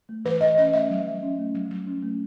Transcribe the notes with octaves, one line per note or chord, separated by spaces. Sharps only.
A3
E3 B4
E3 D#5
C#4 D#5
A3 E5
F#3
F#3
C#4
A3
F#3
F#3
C#4
A3